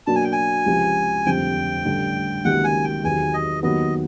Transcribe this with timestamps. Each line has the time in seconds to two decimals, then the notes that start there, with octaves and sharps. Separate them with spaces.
0.07 B2 F#3 A#3 D4 A5
0.16 G#5
0.24 G5
0.32 G#5
0.66 C#2 C3 F3
1.25 F1 F2 D3 G3 C4 G5
1.85 A1 G2 D3
2.45 C#2 C3 D#3 F#3 A#3 F#5
2.64 G#5
2.84 G5
3.04 E2 C3 D#3 F#3 G#5
3.34 D#5
3.63 D#2 D#3 F#3 B3 D#5